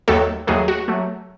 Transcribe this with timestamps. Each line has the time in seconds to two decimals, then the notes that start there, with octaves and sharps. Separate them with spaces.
0.08 D#2 D#3 F#3 A3 A4
0.47 D#2 D#3 F#3 A3 G#4
0.68 F#4
0.88 F#3 A3